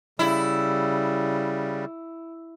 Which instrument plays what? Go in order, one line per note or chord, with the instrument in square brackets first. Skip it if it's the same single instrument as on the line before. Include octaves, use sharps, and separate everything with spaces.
[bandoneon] C#3 G3 [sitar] E4